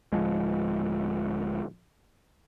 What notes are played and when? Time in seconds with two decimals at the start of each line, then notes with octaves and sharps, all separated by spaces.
0.12 D1 A#1 F3 G#3